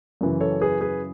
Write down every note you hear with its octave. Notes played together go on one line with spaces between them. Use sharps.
F#2 C#3 E3
A4 C#5
G#4 B4
G#4 B4